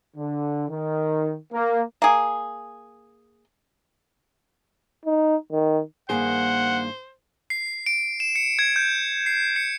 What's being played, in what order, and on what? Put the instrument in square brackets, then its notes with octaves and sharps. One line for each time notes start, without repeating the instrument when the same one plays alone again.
[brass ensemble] D3
D#3
A#3
[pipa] A#3 G#4
[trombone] D#4
D#3
[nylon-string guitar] G2 D#3 G#4 [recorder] A#3 [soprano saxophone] C5 [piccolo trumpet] F#5
[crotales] C7
D7
E7
C#7
G#6
G6
C7
C#7